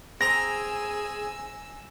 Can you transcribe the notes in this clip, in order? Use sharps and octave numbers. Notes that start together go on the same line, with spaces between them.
C4 G#4 G#5 A#5 E6 A#6